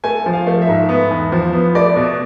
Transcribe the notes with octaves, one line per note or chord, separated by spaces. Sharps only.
A3 G#5
F3
F5
A3
E5
G#2
B3
E2
F3
B3
A3 D5
B2